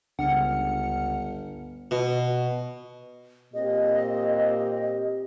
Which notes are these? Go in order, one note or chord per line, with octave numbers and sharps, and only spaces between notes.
G1 C#2 D4 F#5 F6 C#7
B2
A#2 C4 G4 D#5